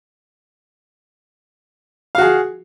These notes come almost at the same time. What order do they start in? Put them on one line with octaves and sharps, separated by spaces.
F5 F#4 G#4